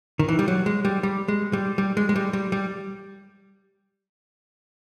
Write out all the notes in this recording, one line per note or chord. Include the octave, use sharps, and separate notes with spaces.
D#3
E3
G3
F#3
G#3
G3
G3
G#3
G3
G3
G#3
G#3
G3
G3
G3